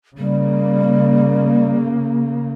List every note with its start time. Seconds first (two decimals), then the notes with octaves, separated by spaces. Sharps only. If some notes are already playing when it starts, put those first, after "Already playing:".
0.18 C#3 G3 A#3